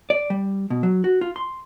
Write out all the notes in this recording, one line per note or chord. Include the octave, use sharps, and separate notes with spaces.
D5
G3
B2
F#3
F#4
F4
C6